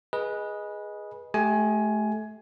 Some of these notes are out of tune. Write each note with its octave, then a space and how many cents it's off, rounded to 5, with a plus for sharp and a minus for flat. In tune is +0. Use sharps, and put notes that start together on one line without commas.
G#4 +0 B4 -20 D#5 +0
A3 -30 G4 +0 G#5 +15